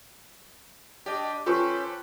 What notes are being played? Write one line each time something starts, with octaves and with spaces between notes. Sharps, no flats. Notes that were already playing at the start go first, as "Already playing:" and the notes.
D4 G4 D5 D#5
C#4 F4 G4 A4 B4 C5 C#6